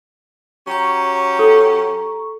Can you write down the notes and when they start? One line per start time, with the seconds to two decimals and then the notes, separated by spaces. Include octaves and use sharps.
0.67 F#3 C#4 G4 A#5 C#6
1.39 A4